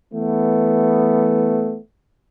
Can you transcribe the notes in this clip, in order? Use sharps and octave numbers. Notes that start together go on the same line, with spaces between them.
E3 A3 B3